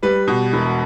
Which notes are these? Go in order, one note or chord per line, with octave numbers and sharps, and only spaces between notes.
G3 B4
B2
E1